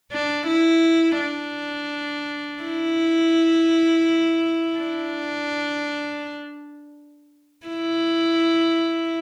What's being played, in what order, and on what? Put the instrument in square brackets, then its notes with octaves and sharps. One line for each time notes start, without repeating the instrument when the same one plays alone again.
[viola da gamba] D4
E4
D4
E4
D4
E4